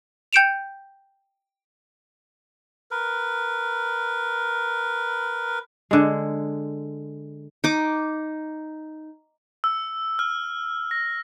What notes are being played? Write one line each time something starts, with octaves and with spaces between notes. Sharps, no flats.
G5 G6 C#7 D7 E7 F7
A#4 B4
D3 G#3
D#4 D6
E6
F6
A#6